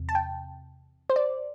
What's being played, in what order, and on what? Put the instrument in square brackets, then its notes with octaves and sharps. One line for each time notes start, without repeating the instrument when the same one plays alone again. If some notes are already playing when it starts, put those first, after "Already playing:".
Already playing: [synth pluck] E2 C3
A5
G5
C5
D5